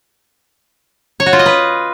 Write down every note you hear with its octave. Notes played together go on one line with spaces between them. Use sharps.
C#5
F#4
F4
D#5
B4